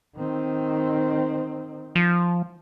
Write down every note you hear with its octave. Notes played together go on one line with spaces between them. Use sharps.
D#3 C4
F3